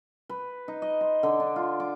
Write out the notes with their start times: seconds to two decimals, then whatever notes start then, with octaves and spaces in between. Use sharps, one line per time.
0.29 B4
0.68 D#4
0.82 D#5
1.01 C6
1.23 D3
1.40 D4
1.56 F4
1.80 D6